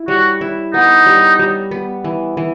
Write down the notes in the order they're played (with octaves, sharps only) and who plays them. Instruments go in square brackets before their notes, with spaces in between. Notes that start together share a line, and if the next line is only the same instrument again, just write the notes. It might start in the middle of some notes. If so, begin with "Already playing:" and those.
Already playing: [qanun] E4
[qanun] G3 [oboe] F#4
[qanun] E4
[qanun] B3 [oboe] D#4
[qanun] G3
G3
B3
E3
E3